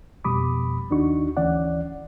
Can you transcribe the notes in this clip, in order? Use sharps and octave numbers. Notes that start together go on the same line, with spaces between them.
F2 B2 G3 B5 D6 D#6
D#2 D#3 D4 D#4 F#4 C#6
D2 E3 C#4 D5 F#5